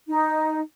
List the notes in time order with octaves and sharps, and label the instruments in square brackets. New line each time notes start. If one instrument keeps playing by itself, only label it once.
[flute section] D#4